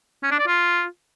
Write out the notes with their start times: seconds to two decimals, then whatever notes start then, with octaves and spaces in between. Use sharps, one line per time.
0.23 C#4
0.31 D4
0.39 D5
0.47 F4